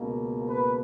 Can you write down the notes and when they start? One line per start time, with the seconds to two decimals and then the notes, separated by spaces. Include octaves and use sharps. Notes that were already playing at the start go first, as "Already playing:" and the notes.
Already playing: C#2 B2 A#3
0.48 B4